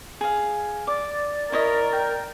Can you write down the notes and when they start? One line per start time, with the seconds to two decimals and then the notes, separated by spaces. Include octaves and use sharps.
0.21 G#4 F5
0.87 D5 D6
1.52 E4 A#4 C#5 D#5
1.93 G5